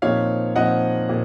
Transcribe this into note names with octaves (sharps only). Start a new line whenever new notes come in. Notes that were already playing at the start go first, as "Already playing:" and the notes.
A#2 F3 C4 D#4 C#5 F5
A#2 F3 C4 D#4 D#5 F#5
A#2